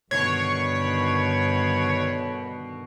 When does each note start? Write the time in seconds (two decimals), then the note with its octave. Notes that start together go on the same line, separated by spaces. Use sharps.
0.11 G2 B2 D3 D#3 C#5